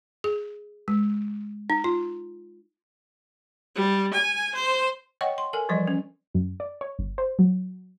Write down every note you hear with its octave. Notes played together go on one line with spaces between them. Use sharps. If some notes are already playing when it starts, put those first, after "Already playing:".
G#4
G#3
D#4
F4
G3
G#5
C5
C#5 D#5 F#5 G5 C#6
C6
A4 A#4 G#5
E3 F3 G3 D5 D#5
C#4
F#2
D5
C#5
G1
C5
F#3